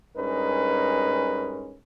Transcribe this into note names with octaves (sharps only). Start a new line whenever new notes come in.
G2 G#3 C#4 D#4 A#4 B4